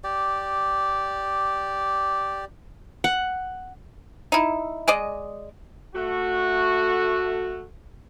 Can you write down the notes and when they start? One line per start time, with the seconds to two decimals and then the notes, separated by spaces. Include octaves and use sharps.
0.04 G4 D5
3.04 F#5
4.32 D#4 E4
4.88 G#3 D5 D#5
5.95 A3 F#4